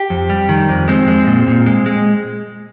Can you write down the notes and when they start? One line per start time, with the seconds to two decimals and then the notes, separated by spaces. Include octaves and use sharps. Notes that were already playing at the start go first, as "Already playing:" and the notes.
Already playing: G4
0.10 F2
0.30 G3
0.49 D#3
0.69 F2
0.88 G#3 C4
1.08 G#3
1.27 A#2
1.47 A#2
1.66 G#3
1.86 G#3